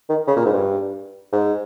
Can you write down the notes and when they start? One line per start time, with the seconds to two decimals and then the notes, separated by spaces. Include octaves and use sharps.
0.09 D#3
0.27 C#3
0.36 A#2
0.45 G#2
0.53 G2
1.32 G#2